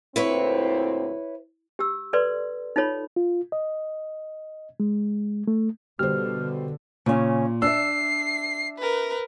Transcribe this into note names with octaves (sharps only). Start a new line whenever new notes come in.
D2 A#2 C4 E4 B4 C#5
G4 E6
A4 B4 D5 C6
D#4 F4 A4 C#5 B5
F4
D#5
G#3
A3
B2 D3 G3 C5 F6
A#2 C#3 C#4
D4 E5 E6 C7
A#4 B4